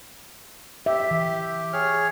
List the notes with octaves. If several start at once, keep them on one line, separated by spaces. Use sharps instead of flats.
G4 E5
E3
G#4 C#5 F6